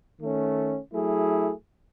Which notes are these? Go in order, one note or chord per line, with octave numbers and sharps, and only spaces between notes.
D#3 A3 C#4
F#3 A3 E4 G#4